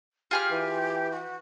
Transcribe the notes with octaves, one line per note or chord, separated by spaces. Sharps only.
F4 G4 G#4 F6
E3
F#4